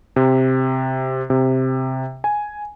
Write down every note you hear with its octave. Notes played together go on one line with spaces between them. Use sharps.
C3
C3
G#5